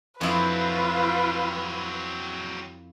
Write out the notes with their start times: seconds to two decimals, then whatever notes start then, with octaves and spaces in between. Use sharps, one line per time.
0.21 F2 F#3 C4 E4 F4 B4